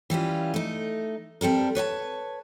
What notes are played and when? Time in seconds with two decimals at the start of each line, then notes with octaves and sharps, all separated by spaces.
0.10 E3 G3 C#4 F4
0.54 A3 D#4
1.41 G3 C4 A4 A#4
1.75 B4 C#5 D#5 A5